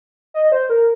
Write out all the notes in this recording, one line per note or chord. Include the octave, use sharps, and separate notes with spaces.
D#5
C5
A#4